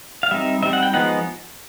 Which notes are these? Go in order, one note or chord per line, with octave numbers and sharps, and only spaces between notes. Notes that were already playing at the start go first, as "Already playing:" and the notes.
F5
G3 C4 D#4 E5
G3 C4 D#4 E5
F#5
G5
F3 G#3 B3 D#4 F#5